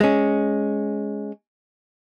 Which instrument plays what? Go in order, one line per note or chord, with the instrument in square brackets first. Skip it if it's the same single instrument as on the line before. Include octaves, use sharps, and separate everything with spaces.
[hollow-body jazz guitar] G#3 C#4